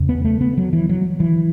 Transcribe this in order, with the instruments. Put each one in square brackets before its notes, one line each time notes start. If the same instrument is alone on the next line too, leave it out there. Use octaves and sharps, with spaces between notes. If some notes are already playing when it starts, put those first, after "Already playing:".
Already playing: [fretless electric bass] E2 C#3
B3
A3
B3
F#3
E3
F#3
E3